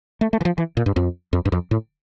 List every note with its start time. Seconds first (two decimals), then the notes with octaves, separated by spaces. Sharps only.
0.21 A3
0.33 A3
0.41 E3
0.45 F3
0.58 E3
0.77 A#2
0.86 G2
0.96 F2
1.33 F2
1.45 G2
1.52 F2
1.71 A2